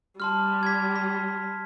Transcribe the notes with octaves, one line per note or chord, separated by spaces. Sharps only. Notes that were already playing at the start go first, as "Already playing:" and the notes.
G3 A5 C6 F6
G#6 B6
B6